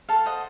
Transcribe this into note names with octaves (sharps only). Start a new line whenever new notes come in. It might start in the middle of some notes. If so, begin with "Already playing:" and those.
A4 F5 A5
C5 D#5 F#5